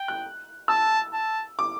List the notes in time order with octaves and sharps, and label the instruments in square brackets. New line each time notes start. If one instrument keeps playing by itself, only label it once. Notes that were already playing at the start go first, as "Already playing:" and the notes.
Already playing: [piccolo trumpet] G5
[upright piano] F#6
[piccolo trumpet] A5 [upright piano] E6
[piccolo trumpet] A5
[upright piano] D6